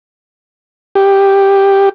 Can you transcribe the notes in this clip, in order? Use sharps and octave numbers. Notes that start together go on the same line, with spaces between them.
G4